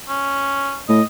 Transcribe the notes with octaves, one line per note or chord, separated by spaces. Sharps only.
C#4
A2 D#5